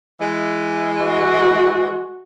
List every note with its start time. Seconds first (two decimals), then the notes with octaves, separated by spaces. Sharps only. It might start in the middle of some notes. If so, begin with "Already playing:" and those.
0.20 E3 G#3
1.04 F#4